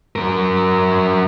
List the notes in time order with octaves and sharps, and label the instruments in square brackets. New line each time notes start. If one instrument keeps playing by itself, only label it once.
[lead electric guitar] F#3 A#4